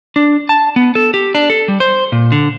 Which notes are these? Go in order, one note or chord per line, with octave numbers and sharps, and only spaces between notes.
D4
A5
B3
A4
G4
D4
A4
G3
C5
A#2
D3